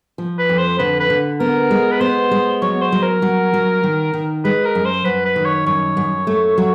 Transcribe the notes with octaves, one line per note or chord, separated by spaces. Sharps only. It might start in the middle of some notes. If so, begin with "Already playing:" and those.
F3
B4
F2
C5
D3 B4
B4
D3
B3 A#4
G#3
B4
B3 C5
G#3
F#3 C#5
C5
F#3
A#4
F#3
F#3
D#3
D#3
G#3 B4
A#4
F#2
C5
F#2 B4
B4
D#3
C#5
F#2 C#5
F#2
A3
F#3